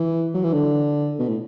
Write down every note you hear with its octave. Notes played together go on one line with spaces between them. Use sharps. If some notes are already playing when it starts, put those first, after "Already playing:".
Already playing: E3
F#3
E3
D3
B2
A2